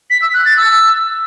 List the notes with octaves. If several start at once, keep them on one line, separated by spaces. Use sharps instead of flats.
B6
E6
F#6
A6
E6